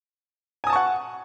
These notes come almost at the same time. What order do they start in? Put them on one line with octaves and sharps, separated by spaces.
G#5 D#6 A5 C#6 F#5